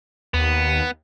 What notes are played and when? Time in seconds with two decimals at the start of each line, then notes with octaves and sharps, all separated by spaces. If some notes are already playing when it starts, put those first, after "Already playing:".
0.34 D#2 B3